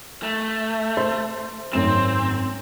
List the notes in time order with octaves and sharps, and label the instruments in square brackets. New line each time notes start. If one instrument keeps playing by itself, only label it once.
[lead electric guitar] A3
[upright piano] C5
[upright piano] G#1 F#2 E7 [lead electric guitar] C4